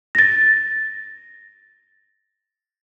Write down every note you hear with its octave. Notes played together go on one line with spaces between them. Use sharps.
A6 A#6